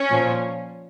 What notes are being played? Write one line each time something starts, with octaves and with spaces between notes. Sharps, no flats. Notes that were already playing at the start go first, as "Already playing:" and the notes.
Already playing: C#4
A#2 F3